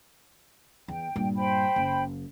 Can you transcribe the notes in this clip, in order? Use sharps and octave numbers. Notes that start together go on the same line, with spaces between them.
E2 G5
G2 A#2
C5 G5 B5
F#1